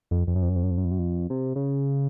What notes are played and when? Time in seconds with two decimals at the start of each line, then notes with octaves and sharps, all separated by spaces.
0.11 F2
0.27 F2
0.35 F#2
0.42 F2
0.49 F#2
0.56 F2
0.63 F#2
0.71 F2
0.78 F#2
0.85 F2
0.91 F#2
0.99 F2
1.30 C3
1.56 C#3